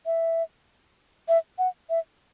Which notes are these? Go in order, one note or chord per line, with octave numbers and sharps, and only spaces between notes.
E5
E5
F#5
E5